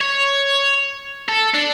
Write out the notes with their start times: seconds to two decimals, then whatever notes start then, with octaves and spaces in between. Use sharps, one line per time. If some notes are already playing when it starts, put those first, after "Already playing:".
0.01 C#5
1.28 A4
1.54 D4